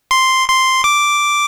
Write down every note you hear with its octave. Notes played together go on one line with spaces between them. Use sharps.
C6
C6
D6